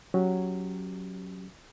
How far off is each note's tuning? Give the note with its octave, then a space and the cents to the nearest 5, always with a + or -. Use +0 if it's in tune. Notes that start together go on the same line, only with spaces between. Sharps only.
F#3 +0 C#4 +0 G4 +0